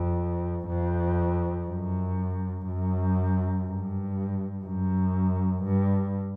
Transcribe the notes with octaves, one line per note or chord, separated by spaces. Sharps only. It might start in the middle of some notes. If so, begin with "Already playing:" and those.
Already playing: F2
F2
F#2
F#2
G2
F#2
G2